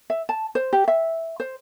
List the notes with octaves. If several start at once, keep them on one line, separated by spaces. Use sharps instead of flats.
E5
A5
C5
G4
E5
C5